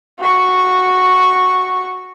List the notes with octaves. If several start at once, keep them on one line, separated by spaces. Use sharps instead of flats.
F#4 C#6